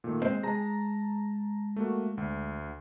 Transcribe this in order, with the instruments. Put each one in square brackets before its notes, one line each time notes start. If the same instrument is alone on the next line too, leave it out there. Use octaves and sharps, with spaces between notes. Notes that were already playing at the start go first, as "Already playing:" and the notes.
[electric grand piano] A#2 D#3 A3
[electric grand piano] G#3 [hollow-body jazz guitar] C4 C5 D#5
[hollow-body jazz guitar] G#3 G#4 [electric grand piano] A5 A#5 A#6
[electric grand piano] A3 A#3 F#4
D2